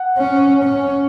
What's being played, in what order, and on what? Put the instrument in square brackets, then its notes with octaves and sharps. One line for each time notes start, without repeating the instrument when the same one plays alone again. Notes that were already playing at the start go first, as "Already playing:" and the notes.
Already playing: [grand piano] F#5
[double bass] C#4
C#4